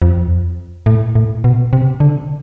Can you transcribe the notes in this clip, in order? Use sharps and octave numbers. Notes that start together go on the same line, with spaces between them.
F2
A2
A2
B2
C3
D3